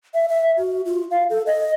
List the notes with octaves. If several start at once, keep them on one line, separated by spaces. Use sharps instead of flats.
E5
E5
F#4
F4
F5
A4
D#5